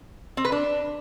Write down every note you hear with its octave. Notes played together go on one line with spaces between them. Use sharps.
C4
B4
D4